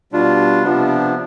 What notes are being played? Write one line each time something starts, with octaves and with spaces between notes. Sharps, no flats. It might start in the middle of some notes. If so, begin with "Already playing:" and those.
B2 G3 D4 F4
C3 F3 B3 D4